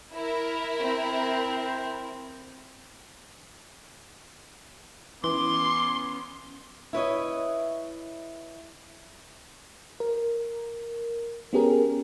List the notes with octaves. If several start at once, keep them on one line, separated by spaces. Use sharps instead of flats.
E4 A#4
C4
E3 B3 C#4 C6 D6
E4 B4 C#5 D#5
A#4
B3 C#4 G4 G#4 A#4